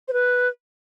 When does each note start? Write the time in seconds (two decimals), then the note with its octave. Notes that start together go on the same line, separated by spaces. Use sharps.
0.08 C5
0.13 B4